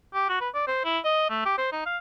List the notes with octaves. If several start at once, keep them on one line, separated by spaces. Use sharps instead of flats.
G4
F#4
B4
D5
C5
E4
D#5
A3
G4
C5
D#4
F5